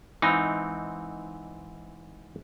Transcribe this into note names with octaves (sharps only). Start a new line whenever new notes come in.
G#2 E3 C4 D#4